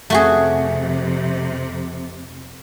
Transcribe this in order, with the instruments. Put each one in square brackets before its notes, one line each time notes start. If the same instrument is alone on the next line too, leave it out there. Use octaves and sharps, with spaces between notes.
[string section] F2 C3 [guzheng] A3 F#4 G#4